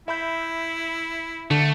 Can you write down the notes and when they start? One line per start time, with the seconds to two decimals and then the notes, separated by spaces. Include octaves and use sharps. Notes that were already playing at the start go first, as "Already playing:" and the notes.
0.08 E4 E5 B5 G6
1.51 D3 A3